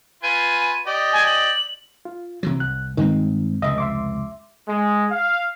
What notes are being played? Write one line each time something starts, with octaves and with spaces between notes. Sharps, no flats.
F4 B4 G#5 D#7
G4 D5 D#5
G#5
F#7
F4
C3 E3 F#3
C2 F#6
G2 D#3 G#3 C4
F1 C#2 C#3 D#5 E5
E5 C6 D6
G#3
F5